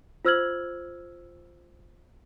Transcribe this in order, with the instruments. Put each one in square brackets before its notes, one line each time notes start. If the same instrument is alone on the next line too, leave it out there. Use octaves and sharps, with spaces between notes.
[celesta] F4 C5 E6 F6 G#6 F#7